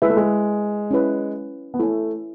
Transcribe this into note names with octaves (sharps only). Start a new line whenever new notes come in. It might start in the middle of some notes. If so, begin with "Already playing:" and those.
G#3 E4 B4 E5
A3
G#3
C#4 E4 B4
B3
A3 E4 A4 C#5 G#5